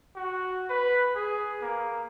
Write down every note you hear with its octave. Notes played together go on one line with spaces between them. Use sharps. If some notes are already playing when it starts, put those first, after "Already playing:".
F#4
B4
G#4
A#3